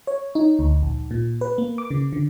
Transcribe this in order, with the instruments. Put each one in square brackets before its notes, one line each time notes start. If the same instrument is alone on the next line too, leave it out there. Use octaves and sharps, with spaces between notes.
[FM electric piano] C#5
D#4
D2
A#1
A#2
B4
A#3
D6
C#3
D3